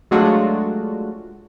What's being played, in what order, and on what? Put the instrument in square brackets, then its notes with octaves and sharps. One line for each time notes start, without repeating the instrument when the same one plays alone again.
[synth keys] F#3 G#3 A3 D4 F4 F#4